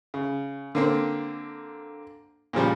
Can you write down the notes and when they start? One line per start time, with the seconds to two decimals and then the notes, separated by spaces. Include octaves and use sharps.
0.14 C#3
0.75 D3 A#3 C4
2.53 A#2 C#3 F3 G3